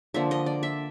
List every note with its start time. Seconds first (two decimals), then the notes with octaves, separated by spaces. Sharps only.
0.14 D3 F3 A#3 E5
0.31 D#5
0.46 D5
0.63 E5